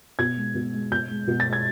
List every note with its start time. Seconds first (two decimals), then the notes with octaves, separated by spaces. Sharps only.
0.19 B2 G#6
0.36 G#3
0.55 B2
0.73 G#3
0.92 B2 G6
1.10 G#3
1.28 B2
1.40 A6
1.46 G#3
1.53 G#6